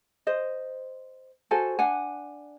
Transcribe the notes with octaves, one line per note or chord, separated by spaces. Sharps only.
C5 D#5
F#4 A4 C5 G#5
D4 F#5 G#5